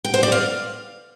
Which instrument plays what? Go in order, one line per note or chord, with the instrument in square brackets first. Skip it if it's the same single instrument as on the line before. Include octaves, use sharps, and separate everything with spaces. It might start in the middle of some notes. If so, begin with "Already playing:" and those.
[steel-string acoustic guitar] G5
C5
D5
F5